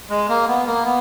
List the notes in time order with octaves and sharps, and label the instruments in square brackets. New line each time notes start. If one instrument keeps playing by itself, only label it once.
[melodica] G#3
A#3
B3
A#3
B3